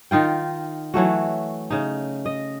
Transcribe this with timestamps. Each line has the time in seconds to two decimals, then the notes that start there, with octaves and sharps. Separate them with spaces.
0.11 D#3 D#4 F4 G5
0.94 E3 F#3 A3 F#4
1.70 C#3 D#4
2.26 D#5